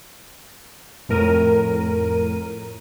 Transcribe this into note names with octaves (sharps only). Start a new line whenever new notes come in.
F2 A2 A#4 D#7